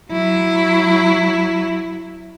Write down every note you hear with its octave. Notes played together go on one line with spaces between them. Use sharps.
F#3 E4